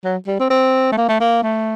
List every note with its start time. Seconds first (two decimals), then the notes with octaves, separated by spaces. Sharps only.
0.04 F#3
0.27 G3
0.40 C4
0.50 C4
0.92 A3
0.97 A#3
1.09 A3
1.20 A#3
1.43 A3